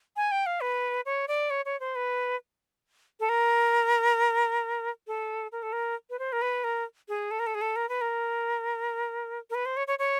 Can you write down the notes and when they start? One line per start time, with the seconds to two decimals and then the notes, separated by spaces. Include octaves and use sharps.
0.16 G#5
0.31 G5
0.46 F5
0.61 B4
1.05 C#5
1.28 D5
1.50 C#5
1.65 C#5
1.80 C5
1.95 B4
3.20 A4
3.29 A#4
5.07 A4
5.52 A#4
5.62 A4
5.72 A#4
6.10 B4
6.19 C5
6.32 A#4
6.42 B4
6.64 A#4
7.08 G#4
7.31 A4
7.39 A#4
7.46 A4
7.54 G#4
7.61 A4
7.76 A#4
7.89 B4
8.01 A#4
9.50 A#4
9.54 B4
9.65 C5
9.77 C#5
9.87 C#5
9.99 C#5